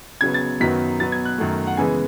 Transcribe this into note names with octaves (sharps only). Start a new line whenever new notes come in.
C#3 F#3 B3 G#6
A6
F#2 D#3 F#3 B3 B6
B2 F#3 B3 A6
G#6
F#6
F#2 D#3 A3
F#5
C#3 E3 G#3 B3 G#5